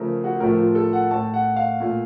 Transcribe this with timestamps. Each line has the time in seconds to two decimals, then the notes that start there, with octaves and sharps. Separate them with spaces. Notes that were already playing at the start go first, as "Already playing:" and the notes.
Already playing: C#3 F3 A3 A#4 C5
0.24 F#4
0.40 A2 F3 A3 A#4
0.58 F4
0.75 A4
0.93 F#5
1.11 A2 A3 A5
1.34 F#5
1.57 F5
1.80 A#2 A3